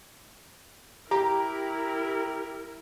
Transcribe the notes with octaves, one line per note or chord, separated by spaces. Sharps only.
E4 G4 A#4 A#5